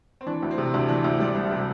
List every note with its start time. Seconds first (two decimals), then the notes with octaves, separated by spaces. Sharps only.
0.21 C4
0.27 E3 D4
0.43 D2
0.51 C4
0.58 C3
0.73 D2 D4
0.88 E3 D4
1.04 D2 C5
1.20 G3 D5
1.35 C2
1.51 C3